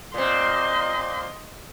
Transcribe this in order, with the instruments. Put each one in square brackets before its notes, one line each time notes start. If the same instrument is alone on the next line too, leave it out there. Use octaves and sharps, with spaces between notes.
[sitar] A#2 C4 [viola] D#5 C6